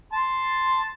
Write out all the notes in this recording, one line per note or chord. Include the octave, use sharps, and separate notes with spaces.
A5 C6